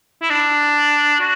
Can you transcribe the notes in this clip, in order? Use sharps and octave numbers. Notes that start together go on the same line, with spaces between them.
E4
D4
F#4